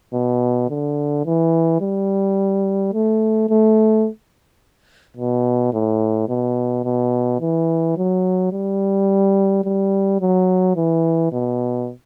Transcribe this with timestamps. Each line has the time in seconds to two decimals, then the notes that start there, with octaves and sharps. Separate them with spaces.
0.13 B2
0.69 D3
1.26 E3
1.81 G3
2.93 A3
3.49 A3
5.17 B2
5.73 A2
6.29 B2
6.85 B2
7.41 E3
7.97 F#3
8.52 G3
9.64 G3
10.20 F#3
10.76 E3
11.32 B2